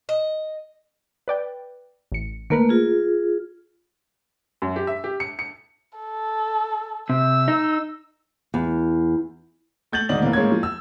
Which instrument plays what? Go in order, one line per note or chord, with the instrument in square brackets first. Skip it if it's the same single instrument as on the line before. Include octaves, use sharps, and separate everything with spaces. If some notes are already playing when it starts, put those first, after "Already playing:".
[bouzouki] D#5
[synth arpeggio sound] B4 D5 G5
A1 C#7
[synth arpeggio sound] D#3 A#4 B4 [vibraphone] A3 A#3
[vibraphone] F4 G#4
[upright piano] F#2
G4
E5
G4
C#7
C#7
[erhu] A4
[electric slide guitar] C3 [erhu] E6
[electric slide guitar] D#4
[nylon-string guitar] E2
[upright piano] A3 G6 A6 F#7
D2 G#2 D#3 D5 D#5 F#7
F1 E3 A#3
A2 G#3 A#3 C#4 E4 G#6
F3
E6